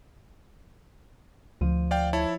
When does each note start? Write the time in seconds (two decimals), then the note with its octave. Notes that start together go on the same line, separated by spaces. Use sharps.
1.61 D2 F3 D#7
1.91 D5 F5 G5
2.13 E4 C#5 A5